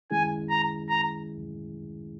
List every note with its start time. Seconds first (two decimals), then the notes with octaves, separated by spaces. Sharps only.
0.11 D#3 G#3 C#4 E4 G#4 G#5
0.50 A#5
0.89 A#5